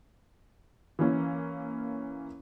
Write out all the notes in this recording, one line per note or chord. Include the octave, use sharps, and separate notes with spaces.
E3 A#3 C#4